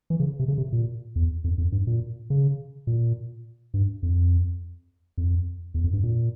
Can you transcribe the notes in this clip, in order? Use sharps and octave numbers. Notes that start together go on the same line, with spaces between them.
E3
C#3
C3
C#3
C3
A#2
E2
F2
F2
G2
A#2
C#3
A#2
G2
F2
F2
E2
F2
G2
A#2